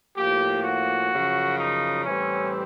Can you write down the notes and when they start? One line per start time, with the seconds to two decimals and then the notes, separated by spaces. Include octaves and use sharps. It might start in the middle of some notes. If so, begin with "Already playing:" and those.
0.17 A2 F3 A#3 G4
0.63 F#4
1.11 F#2 C#3 F3
1.58 D#4
2.05 A2 E3 G3 C4 C#4